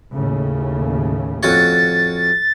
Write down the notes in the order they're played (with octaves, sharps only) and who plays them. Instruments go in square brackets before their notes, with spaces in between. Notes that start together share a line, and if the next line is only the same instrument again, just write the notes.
[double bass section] D#2 A2 C#3
[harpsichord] F2 F#4 C#5 [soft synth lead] A6